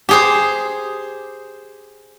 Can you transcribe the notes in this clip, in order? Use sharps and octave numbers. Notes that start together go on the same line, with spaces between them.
G4 G#4 C5